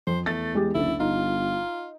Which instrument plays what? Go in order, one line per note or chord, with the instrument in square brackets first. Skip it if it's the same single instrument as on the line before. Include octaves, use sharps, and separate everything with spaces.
[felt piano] F2 [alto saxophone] C5
[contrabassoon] E2 [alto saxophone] A3 [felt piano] A6
[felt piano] G#3 G4
[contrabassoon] F#1 [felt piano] D2 D3 [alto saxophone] E4
[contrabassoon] G1 [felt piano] D#4 [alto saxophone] F4